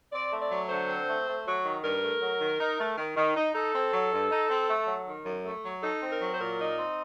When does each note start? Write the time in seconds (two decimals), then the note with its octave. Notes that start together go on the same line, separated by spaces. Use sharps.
0.13 C4 D5
0.32 A3
0.41 D5
0.50 F#3
0.70 D3 C5
0.89 C4
1.08 A3
1.27 A3
1.46 F#3
1.65 D#3
1.84 G2 A#4
2.03 A3
2.22 F#3
2.41 D#3
2.59 D#4
2.78 A3
2.98 D#3
3.17 D#3
3.36 D#4
3.54 D#4 A4
3.74 C4
3.93 F#3
4.12 G2
4.31 D#4
4.50 C4
4.69 A3
4.87 F#3
5.07 D#3
5.25 F#2
5.45 A3
5.64 F#3
5.83 D#4 A4
6.01 C4
6.11 A#4
6.21 F#3
6.33 C5
6.40 A#2 A#4
6.60 D#4
6.78 C4